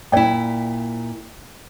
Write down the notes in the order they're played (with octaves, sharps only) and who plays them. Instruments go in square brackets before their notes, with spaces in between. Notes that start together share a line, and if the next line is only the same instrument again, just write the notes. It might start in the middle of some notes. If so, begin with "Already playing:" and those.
[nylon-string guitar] A#2 E4 [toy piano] D5 G5